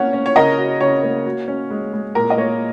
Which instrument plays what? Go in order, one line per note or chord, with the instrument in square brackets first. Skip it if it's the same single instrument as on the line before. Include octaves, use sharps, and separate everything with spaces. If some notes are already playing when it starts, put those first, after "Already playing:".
Already playing: [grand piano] A#3 C#4 [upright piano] C#5 F#5
[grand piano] C#4
[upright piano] C#5
[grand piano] C#3 [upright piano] A#4 D#5
[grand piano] F#4
[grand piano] C#3 [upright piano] C#5
[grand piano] A#3
F#4
C#4
G#3
G#3
[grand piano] A#2 [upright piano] A#4
[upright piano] D#5
[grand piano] A#3 [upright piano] C#5